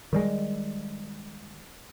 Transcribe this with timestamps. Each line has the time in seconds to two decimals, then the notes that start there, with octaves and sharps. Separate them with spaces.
0.13 D#3 G3 G#3